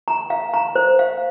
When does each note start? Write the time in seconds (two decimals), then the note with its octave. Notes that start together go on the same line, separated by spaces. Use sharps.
0.08 A#5
0.30 F5
0.54 A#5
0.75 C5
0.99 F5